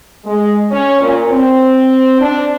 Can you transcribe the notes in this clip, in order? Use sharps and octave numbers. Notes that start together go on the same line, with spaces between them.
G#3
C#4
A#2
C4
D4